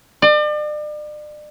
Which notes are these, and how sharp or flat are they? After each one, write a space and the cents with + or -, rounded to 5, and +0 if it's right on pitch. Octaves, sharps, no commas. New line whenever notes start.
D5 +40